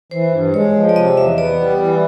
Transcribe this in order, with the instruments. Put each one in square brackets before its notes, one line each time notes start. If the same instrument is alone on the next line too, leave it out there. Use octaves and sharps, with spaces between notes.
[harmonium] E3 [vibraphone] C5
[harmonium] G2
[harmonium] G#3 [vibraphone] C#5
[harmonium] F3
[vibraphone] D5
[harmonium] C3 [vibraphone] D#5
[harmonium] E2 [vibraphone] E5
[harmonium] B3 [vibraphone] D5
[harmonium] G3
E3